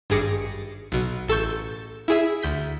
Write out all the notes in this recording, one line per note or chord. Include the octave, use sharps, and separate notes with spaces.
G#1 G2 G#4 D6 A#6 C#7
B1 B2
A1 A4 A5 C#6 G6
E4 G#4 E5
D2 G6 B6